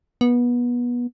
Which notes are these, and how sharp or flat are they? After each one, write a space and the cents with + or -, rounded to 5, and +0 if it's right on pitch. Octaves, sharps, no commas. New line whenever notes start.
B3 -25